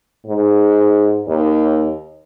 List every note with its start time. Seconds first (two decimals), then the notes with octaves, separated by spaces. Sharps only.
0.26 G#2
1.27 D#2